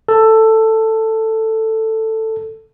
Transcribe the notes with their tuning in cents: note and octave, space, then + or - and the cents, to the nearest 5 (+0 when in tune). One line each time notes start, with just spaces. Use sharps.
A4 +10